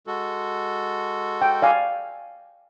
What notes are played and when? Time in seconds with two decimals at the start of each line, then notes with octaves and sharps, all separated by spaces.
0.07 G#3 F#4 A4
1.42 G5
1.62 D5 F5 G#5